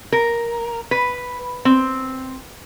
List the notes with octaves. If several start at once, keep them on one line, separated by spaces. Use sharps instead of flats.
A#4
B4
C4